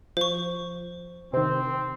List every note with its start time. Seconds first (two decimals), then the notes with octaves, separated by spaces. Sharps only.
0.17 F3 C5 C#6
1.33 C3 D#3 C4